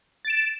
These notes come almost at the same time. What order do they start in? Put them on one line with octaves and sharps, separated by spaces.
A6 D7 E7